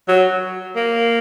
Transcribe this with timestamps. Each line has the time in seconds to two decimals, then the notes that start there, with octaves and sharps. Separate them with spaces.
0.09 F#3
0.76 A#3